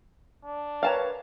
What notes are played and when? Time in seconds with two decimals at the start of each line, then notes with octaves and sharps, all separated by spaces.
0.45 D4
0.83 A#4 B4 C#5 F5 A5 A#5